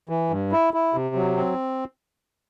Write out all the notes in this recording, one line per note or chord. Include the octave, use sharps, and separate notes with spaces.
E3
G2
E4
E4
C3
F#3
C4